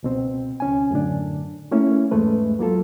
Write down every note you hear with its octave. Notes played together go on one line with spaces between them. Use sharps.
C#2 B2 C4
C#2 C#4 G#5
F#2 A2 D3 D4
A3 A#3 C#4 E4
E2 G#2 G#3 A3 B4
F#3 A#3 F4 A4